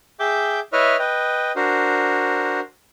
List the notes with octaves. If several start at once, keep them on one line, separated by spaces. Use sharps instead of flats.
G#4 E5 G5 D6 G6
E4 B4 C#5 D#5 E5 F6
B4 D#5 G5
D4 F#4 A#4 C5